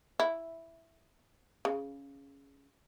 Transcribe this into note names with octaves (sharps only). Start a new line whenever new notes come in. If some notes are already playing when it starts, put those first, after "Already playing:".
E4
C#3